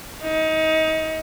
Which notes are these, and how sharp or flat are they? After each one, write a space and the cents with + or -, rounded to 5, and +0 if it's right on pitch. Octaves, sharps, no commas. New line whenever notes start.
D#4 +25